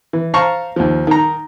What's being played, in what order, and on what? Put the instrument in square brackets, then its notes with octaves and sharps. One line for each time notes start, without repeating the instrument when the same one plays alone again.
[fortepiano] E3
C5 F5 A5 A#5 C#6
D#2 F3
D#3 A#5